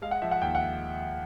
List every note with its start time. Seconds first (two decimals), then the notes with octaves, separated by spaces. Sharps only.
0.02 G#3 F5
0.11 F#5
0.21 F3 E5
0.31 F#5
0.41 D#2 G5
0.55 F#5